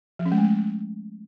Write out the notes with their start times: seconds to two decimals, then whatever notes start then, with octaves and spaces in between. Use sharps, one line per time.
0.19 F3
0.26 C#4
0.32 G#3
0.38 A3